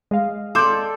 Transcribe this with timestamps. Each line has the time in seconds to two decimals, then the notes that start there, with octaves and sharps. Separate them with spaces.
0.11 G#3 D#5 F5
0.55 A4 D5 C6 D6 G6